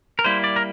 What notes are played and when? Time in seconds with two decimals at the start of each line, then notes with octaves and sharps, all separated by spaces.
0.19 A#4
0.24 G3 A#3 E4 C5
0.44 D5
0.56 A#4